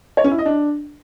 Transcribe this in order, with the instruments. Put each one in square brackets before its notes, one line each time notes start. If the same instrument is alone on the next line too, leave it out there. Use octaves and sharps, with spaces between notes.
[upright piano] C#5
C#4
E4
D#5
D4